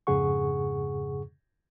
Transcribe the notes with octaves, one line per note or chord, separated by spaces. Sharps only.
F2 G#2 C#3 G#4 F#5 C#6